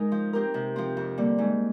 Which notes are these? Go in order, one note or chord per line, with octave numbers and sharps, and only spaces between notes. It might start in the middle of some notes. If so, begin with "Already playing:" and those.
Already playing: G#3 D#4 A#4
F3
C4 G4 A#4
C3
F3 C4
F2
D3 G3 A#3
G#2